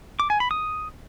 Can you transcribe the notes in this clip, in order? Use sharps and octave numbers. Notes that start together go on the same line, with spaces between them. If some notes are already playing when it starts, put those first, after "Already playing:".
D6
G#5
B5
D#6